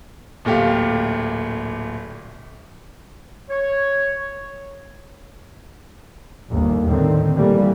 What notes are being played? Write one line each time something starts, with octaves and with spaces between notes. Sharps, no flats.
D1 A#2 A3 G4 F5
C#5
G1 D#2
A2 D3 D#3 C4
A#2 E3 G3 A3 A#3